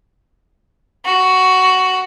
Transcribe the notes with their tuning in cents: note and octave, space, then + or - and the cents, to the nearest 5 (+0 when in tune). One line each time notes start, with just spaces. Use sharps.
F#4 +10